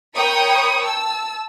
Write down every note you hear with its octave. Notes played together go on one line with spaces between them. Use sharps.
A#4 C#5 G5 B5 C#6 D#6
A5 E6